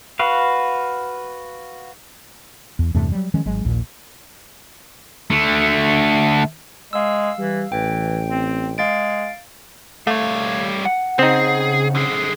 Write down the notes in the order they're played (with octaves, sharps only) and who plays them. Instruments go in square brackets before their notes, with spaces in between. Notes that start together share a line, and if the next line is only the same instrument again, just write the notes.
[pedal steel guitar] F#4 B4 F5
[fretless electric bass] E2
E2 G2 C3 A3
F#3 G3
D#3 F3 G#3 C#4
G#1 F#3 G#3
A#1 D#2 A#2
[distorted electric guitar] D3 A3
[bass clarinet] G#3 [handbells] F5 E6
[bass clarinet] E3 [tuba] G3
[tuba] A1 [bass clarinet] E3 [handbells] G5
[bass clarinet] C4
[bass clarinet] G#3 [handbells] F5 A6 D7
[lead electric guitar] G3 C#5 [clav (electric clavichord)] A3 [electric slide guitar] F5
[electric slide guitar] F#5
[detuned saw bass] C#3 [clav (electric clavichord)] C4 D#4 [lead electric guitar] G#4
[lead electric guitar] D3 G#4